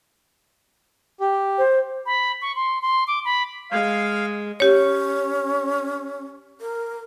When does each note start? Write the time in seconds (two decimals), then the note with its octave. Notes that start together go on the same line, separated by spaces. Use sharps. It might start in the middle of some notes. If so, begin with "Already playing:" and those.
1.20 G4
1.58 C5
2.06 B5
2.42 C#6
2.56 C6
2.82 C6
3.07 D6
3.25 B5
3.71 G#3 F5
4.60 C#4 G4 C#5
6.61 A#4